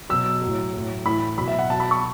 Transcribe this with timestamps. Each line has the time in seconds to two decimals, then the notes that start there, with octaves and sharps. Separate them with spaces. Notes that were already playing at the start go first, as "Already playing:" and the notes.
0.09 B2 F#3 E6
0.42 A2 F#3
0.74 A2 F#3
1.05 A2 E3 B5
1.38 B2 F#3 B5
1.48 E5
1.59 F#5
1.70 B2 F#3 A5
1.80 B5
1.91 C#6